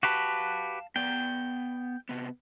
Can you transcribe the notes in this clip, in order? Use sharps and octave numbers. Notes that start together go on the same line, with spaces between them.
F#4 G4 B4 F5 A5
B3 D5 G5
C3 B3